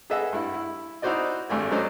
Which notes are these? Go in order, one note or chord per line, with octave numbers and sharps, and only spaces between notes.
G#4 A4 B4 D#5 E5 F#5
G2 E4
E4
D#4 E4 F#4 C5 D5 D#5
G#1 G2 A3 D5 G#5
F#3 A3 C#4 C5 D5 D#5